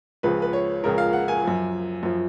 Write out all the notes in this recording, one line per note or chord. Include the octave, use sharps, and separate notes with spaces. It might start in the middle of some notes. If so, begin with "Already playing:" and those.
C#2 C#3 F3 B4
B4
C#5
C#2 C#3 F3 A#4
F5
F#5
G#5
F#2 F3
F#2 F3